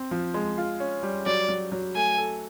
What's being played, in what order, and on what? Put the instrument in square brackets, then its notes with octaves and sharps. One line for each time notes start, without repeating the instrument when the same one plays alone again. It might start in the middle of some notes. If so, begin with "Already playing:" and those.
Already playing: [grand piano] C4
F3
G#3
F4
C#4
G3
[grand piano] F#3 [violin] D5
[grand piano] F#3
F#3
[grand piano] A3 [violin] G#5
[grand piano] A4